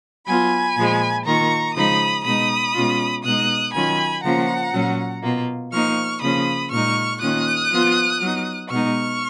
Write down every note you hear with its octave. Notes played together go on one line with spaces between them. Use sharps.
F#3 B3 F4 G#5 B5
A#2 F3 G#3
D#3 A#3 F4 A#5 C#6
C#3 F3 G#3 D#4 B5 D#6
B2 G#3 D#4 B5 D#6
B2 G#3 C#4 F4
B2 G#3 D#4 D#6 F#6
D#3 F#3 C#4 F4 G#5 B5
C#3 F3 A#3 C#4 F4 F#5 A#5
A#2 F#3 C#4
B2 A#3 F4
F3 A#3 D#4 C#6 F6
C#3 F3 A#3 C#4 B5 D#6
A#2 G#3 D#4 C#6 F6
D#3 A#3 C#4 F4 D#6 F#6
F3 B3 F4
F#3 B3 D#4
B2 G#3 B3 D#4 C#6 F6